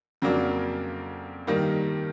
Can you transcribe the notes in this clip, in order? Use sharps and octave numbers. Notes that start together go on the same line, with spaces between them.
F2 C#3 F#3 A#3 D4
G2 D#3 G3 A#3